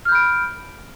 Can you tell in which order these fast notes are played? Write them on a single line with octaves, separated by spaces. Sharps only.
F6 G6 B5 D7